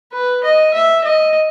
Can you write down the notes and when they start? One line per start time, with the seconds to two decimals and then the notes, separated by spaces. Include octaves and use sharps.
0.13 B4
0.44 D#5
0.74 E5
1.04 D#5